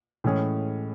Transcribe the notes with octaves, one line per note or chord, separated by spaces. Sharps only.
A2 E3 G#3 C#4 G#4